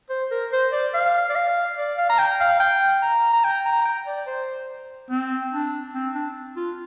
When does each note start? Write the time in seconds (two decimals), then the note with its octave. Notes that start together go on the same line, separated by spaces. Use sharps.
0.10 C5
0.31 A#4
0.52 C5
0.72 D5
0.94 F5
1.29 D5
1.35 F5
1.77 D5
1.97 F5
2.09 A#5
2.19 G5
2.40 F5
2.60 G5
3.02 A#5
3.33 A#5
3.44 G5
3.65 A#5
3.81 A#5
3.85 G5
4.06 D5
4.27 C5
5.10 C4
5.52 D4
5.94 C4
6.15 D4
6.56 F4